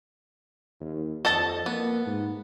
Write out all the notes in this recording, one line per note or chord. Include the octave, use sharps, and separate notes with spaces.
D#2
F2 A4 D#5 A5
A#3 B3
G#2